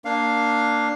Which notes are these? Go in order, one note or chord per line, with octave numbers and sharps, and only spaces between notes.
A#3 D4 F5